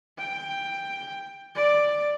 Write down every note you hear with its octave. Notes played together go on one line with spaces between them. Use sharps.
G5
D5